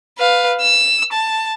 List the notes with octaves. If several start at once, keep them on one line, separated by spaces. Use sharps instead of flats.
B4 F5
E6
A5